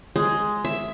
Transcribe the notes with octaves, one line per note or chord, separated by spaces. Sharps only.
G#3
E5